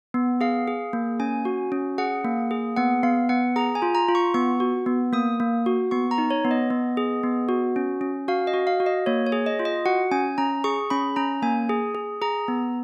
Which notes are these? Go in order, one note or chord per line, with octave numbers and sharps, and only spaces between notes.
B3
G#4 F5
G#4
A#3
C#4 G#5
F#4
C#4
G#4 F#5
A#3
G#4
B3 F#5
B3 F5
B3 F#5
G#4 A#5
G#5
F4
A#5
F4
C#6
B3 C#6
F#4
B3
A#3 D#6
A#3
F#4
B3 C#6
A#5
D#4
C#5
B3
D#5
B3
G#4
B3
F#4
C#4
C#4
F#4 F5
D#5
F#4
F5
F#4
D#5
A#3 C#5
C#5
G#4
D#5
F4
D#5
F#4 F#5
C#4 G#5
C#4 A#5
G#4 C#6
C#4 B5
C#4 A#5
A#3 G#5
G#4
G#4
G#4 A#5
B3